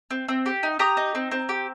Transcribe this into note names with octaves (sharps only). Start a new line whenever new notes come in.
C4
C4
G4
D#4
G4 A#5 D#6
D#4
C4
C4
G4